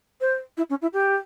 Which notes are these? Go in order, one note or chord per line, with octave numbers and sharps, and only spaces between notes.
C5
E4
C#4
E4
G4